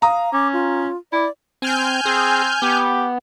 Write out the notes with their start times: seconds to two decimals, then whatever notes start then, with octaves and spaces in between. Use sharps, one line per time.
0.02 F5 A#5 D#6
0.33 C#4 D6
0.53 F4
1.12 E4 D5
1.62 C4 G#5 F6 G6
2.05 C4 G#4
2.62 B3 G4